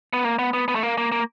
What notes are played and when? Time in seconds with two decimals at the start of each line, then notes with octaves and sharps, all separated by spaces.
0.13 B3
0.24 A#3
0.39 B3
0.53 B3
0.68 B3
0.75 A3
0.83 A#3
0.98 A#3
1.12 A#3